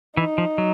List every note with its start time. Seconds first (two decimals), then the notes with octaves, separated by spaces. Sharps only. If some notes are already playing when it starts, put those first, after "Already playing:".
0.17 E3 D#4
0.38 F3
0.58 F#3